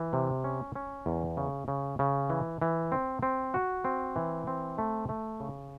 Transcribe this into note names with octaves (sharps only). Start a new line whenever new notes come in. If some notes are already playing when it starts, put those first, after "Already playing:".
Already playing: E3
C3
C#4
C#4
E2
C#3
C#3
C#3
E3
E3
C4
C4
F#4
C4
E3
C4
A3
A3
C#3